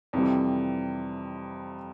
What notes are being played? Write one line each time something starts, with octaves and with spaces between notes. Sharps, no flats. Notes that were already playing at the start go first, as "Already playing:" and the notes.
F2 C3 E3 G3